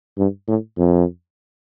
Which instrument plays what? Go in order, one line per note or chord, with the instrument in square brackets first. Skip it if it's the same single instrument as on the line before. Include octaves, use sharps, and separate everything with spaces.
[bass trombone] G2
A2
F2